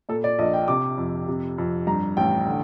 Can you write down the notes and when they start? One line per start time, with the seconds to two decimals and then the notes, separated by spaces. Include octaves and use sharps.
0.09 A#2 A4
0.24 D5
0.39 A#1 D#5
0.53 G5
0.68 C3 D6
0.98 F2
1.28 C3
1.58 F2
1.87 G2 A#5
2.17 A1 G5
2.46 D3